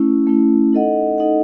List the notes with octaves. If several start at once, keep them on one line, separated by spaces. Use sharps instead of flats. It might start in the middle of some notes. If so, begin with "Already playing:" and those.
Already playing: A3 C#4 E4
A3 C#4 E4
D#4 A4 D#5 F#5
D#4 A4 D#5 F#5